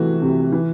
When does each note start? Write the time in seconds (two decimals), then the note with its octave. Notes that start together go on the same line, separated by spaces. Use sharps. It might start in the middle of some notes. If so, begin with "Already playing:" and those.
Already playing: C3 E3 A3 F#4
0.22 C3
0.52 E3